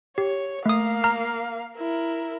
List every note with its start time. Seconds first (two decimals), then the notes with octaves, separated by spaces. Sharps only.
0.18 G4 C#5
0.66 A3 A#3 F5 D#6
1.04 A#5 F6
1.77 E4 A#4